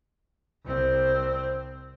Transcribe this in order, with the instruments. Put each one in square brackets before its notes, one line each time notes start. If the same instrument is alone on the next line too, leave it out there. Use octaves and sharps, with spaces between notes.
[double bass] C2 C4